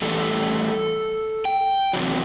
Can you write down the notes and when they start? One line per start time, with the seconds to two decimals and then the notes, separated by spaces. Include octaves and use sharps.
0.02 A2 E3 G3 A4
1.45 G5
1.93 E2 C3 F#3